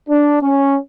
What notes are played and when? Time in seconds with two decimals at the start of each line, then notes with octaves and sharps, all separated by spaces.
0.10 D4
0.43 C#4